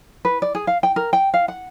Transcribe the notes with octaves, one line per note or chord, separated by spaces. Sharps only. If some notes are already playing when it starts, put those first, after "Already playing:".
B4
D5
G#4
F5
G5
A#4
G5
F5
F#5